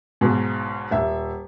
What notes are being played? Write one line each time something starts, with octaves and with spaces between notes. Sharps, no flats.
B1 G#2 B2
D#1 E5